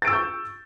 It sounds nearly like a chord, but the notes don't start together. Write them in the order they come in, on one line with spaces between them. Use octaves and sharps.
A6 D7 E6 C#6 G6